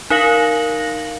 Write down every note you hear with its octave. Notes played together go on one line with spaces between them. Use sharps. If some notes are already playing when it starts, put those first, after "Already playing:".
D#4 A#4 F5 A#6 F#7